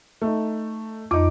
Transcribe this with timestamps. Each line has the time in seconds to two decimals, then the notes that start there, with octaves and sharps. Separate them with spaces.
0.22 A3 D#4
1.11 F2 D#4 D6